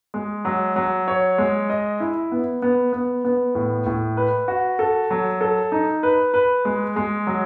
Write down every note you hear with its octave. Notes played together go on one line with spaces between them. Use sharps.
G#3
F#3
F#3
C#5
G#3
D#5
E4
B3
B3
B3
B3
A2
A2
B4
F#4
A4
F#3
A4
D#4
B4
B4
G#3
G#3
F#3